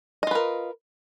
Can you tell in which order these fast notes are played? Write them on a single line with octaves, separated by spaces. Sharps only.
D#5 F4 B4 A#4